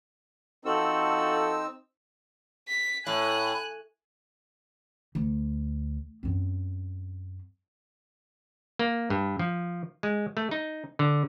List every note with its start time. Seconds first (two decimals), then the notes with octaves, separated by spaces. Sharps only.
0.65 F3 C4 D#4 F#4 A4 E6
2.68 B6
3.07 A2 G#5 F#6
5.15 D2
6.23 F#2 C4
8.79 A#3
9.10 G2
9.39 F3
10.03 G#3
10.37 A3
10.51 D#4
10.99 D3